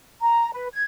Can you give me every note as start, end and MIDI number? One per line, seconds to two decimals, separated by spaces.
0.21 0.51 82
0.53 0.67 71
0.73 0.85 92